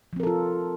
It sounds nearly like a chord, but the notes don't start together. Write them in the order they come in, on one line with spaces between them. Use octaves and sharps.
F3 C4 A#4 A4 F4